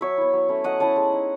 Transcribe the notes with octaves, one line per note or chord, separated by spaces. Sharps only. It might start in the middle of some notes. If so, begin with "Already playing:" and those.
F#3 C#5 E5
B3 E4
F#3
A3 C#4 E4
F#3 D#5 F#5
C#4 E4 F#5 A5
G#3
D#4